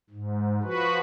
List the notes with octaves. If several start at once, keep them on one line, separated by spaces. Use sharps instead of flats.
G#2
F3 F#4 B4